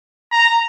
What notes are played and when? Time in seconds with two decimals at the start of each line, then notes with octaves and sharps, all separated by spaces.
0.32 A#5